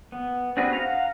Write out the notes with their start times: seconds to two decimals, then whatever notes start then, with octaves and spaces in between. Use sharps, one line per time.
0.12 B3
0.57 C4 D4 F#4 G#4 B4
0.73 F5 F#5 A#5